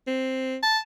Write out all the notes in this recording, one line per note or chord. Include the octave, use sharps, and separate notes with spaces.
C4
A5